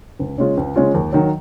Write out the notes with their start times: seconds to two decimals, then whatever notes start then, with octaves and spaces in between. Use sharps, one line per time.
0.19 C#2
0.38 C#3 G#3 C#4 F4
0.57 C#2
0.76 C#3 G#3 C#4 F4
0.94 D#2
1.12 D#3 F#3